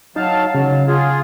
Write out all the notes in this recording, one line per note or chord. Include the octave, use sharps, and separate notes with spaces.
F#3 D#4 F5 A5
C#3 F#3
F4 G#4